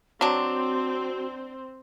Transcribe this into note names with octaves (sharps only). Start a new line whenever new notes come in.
F#3 C4 D4 F#4 C5